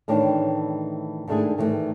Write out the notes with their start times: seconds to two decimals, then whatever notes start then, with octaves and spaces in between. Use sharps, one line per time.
0.08 A2 D#3 E3 D4 C#5 G5
1.28 G#2 D#3 A3 D4 E4 G#4
1.58 A2 D#3 E3 F#3 G3 A3